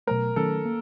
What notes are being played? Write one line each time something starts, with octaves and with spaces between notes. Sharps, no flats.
B2 F#3 A3 A#4
D#3 F#3 A3 C#4 A4
A#3